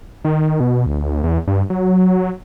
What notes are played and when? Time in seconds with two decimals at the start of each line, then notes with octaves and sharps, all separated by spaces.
0.25 D#3
0.60 B2
0.86 D2
1.24 E2
1.47 G2
1.70 F#3